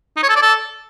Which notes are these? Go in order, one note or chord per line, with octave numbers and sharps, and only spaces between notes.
D#4
C#5
A4
D5
A4